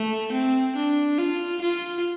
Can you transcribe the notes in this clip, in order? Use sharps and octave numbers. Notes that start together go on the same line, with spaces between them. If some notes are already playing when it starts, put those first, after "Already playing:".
Already playing: A3
C4
D4
F4
F4